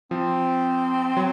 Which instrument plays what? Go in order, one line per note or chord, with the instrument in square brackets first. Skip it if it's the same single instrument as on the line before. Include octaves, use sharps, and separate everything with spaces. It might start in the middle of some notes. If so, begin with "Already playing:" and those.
[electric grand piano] F3 [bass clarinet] C4
[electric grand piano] F#3